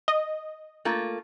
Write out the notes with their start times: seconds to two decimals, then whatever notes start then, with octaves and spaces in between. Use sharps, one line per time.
0.08 D#5
0.85 A3 A#3 F4